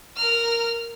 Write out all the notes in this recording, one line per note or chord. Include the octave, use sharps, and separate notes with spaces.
A#4 F6